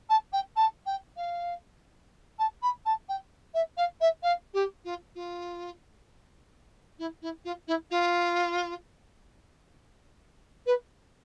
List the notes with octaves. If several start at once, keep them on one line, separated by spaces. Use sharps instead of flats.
A5
G5
A5
G5
F5
A5
B5
A5
G5
E5
F5
E5
F5
G4
F4
F4
E4
E4
F4
E4
F4
B4